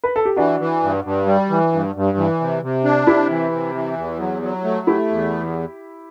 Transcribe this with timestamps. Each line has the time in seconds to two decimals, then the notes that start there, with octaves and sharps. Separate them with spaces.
0.04 B4
0.16 A4
0.25 G4
0.36 E3 D4 F#4
0.60 E3
0.83 G2
1.04 G2
1.26 G3
1.50 E3
1.72 G2
1.95 G2
2.18 E3
2.40 C3
2.63 C3
2.84 D4
3.07 C3 E4 G4
3.30 E3
3.52 C3
3.75 E3
3.97 E2
4.19 F#3
4.42 F#3
4.64 A3
4.87 A3 E4 G4
5.10 E2